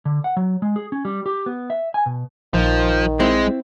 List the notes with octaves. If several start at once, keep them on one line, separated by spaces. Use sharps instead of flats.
D3
F#5
F#3
G#3
G#4
C#4
G3
G4
B3
E5
G#5
B2
A#1 D#3 F3
G#3 C4 E4